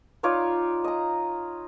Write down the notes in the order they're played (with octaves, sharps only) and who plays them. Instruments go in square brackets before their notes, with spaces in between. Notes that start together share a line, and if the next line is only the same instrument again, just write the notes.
[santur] D#4 F4 C#5 D5
D#5 A#5